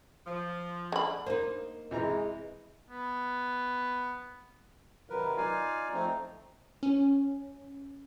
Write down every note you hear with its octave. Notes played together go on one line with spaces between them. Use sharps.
F3
D3 B5
A#3 D#4 C5
C3 E3 G#3 A#5
B3
C3 D#3 F#3 A#4 B4
D#4 F4 D5 F5 G#5
F3 A3 C4 D#4
C#4